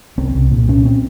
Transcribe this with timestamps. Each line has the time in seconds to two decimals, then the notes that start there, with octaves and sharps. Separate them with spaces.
0.18 C2 C4
0.35 C2
0.51 A#2
0.68 A#2 C#4
0.86 C4